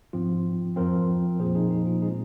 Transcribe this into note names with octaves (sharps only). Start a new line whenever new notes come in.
G#2 F3 C4 F4
F2 F3 C4 F4 A#4
A#2 F3 A#3 G#4 C5
D#4 G#4
D#4
F4
A#2 G#3 C4 D#4 G#4